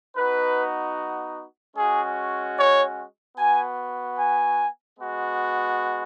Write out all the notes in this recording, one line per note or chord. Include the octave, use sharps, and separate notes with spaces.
B3 D#4 F#4 B4
G#3 C#4 F#4 G#4
C#5
B3 F#4 G#5
G#5
G#3 B3 F#4